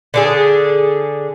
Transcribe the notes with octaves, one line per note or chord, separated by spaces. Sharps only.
D3 D4 G#4